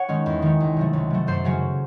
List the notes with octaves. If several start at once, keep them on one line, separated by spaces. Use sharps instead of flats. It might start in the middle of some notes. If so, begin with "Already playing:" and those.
Already playing: C#5 F#5
D#3 G#3 C#4
E2
D#3 G#3 C#4
C#2
C3 F#3 A3
C#2
C3 F#3 A3
F#2 C5
C#3 F#3 C#4